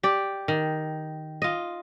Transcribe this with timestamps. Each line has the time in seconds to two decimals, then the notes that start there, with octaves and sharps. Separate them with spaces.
0.03 G4 D5
0.48 D#3
1.42 F4 D#5